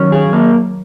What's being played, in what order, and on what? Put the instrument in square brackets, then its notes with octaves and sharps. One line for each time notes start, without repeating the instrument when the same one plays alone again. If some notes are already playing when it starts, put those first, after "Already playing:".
Already playing: [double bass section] D#3 F#3 [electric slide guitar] C#4
[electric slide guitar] G#4
A#3